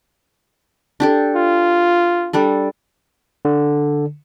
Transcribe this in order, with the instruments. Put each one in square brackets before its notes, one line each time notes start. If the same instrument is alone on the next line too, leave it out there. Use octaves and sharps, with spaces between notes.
[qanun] D4 G4 A4
[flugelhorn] F4
[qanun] G3 D4 A4
[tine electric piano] D3